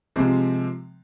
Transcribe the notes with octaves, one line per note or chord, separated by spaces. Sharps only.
C3 F3 G#3 C4